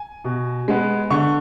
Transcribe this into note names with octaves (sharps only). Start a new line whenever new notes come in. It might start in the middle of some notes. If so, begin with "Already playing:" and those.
Already playing: G#5
B2
G#3 B3
D3 C#6